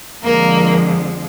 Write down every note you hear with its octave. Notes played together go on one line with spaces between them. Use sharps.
F2 D3 F3 G#3 A#3 A#4